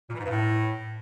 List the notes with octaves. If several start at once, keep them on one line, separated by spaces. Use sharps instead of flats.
A#2
E3
G#2
G2
A2